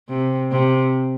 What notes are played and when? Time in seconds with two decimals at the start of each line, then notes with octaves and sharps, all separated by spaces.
0.09 C3
0.52 C3